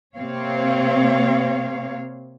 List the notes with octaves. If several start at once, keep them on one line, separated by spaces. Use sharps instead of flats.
C3 A#3 C4 C#5 F5